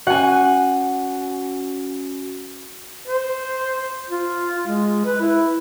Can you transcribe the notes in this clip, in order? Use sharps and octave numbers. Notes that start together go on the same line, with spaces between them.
C#4 F#4 F#5 G#5
C5
F4
G#3
B4
E4